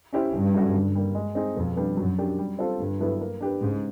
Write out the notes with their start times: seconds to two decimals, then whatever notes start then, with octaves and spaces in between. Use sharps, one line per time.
0.13 C#4 E4 G4 C5
0.33 G2 C#3
0.54 F#3 A3 C#4 F#4
0.74 D3
0.95 G3 A#3
1.15 G#3
1.35 C4 D#4 G#4
1.56 F2 B2
1.76 G3 B3 D4
1.97 F#2 F#3
2.18 A#3 D4 G4
2.38 G3
2.59 C4 F4 A4 C5
2.79 G2 D3
3.01 F#3 B3 E4 A4
3.21 A#3
3.41 D4 G4 B4
3.61 G#2 C#3